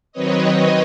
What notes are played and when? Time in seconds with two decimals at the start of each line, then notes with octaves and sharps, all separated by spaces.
0.12 D#3 F#3 C4 B4 C#5 D#5